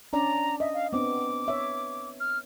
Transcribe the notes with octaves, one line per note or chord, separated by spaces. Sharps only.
C#4 D4 D5 A#5
D#5 E5
F5
B3 C4 D4 D6
C#5 E5
F6